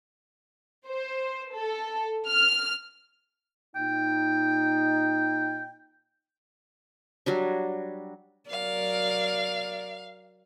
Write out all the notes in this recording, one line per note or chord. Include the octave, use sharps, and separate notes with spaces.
C5
A4
F6
A#2 D#4 G5
F#3 G3 D4
F#3 A#4 D5 F5